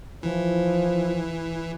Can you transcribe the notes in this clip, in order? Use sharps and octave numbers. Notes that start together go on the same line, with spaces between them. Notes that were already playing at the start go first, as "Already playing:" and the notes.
E3 F3 E4